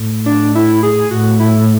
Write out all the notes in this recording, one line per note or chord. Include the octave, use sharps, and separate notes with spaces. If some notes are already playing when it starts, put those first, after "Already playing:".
Already playing: A2
D4
E4
G#4
A2 F#4
E4